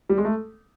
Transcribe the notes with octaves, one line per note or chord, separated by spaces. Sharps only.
G3
G#3
A3